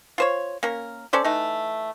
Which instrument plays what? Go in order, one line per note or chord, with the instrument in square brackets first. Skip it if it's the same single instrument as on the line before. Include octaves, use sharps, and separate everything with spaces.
[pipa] F4 C5 C#5
A#3 C#4 A#4
C#4 A4 C5 D5
E3 A3 D#4